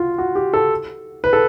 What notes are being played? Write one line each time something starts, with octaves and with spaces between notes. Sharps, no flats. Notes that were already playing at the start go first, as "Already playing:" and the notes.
Already playing: F4 F#4
F#4
G4
A4
B4
A4